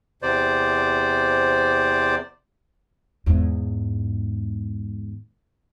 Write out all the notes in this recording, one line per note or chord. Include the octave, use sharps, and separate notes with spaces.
E2 C3 C5 D5
E2 G#2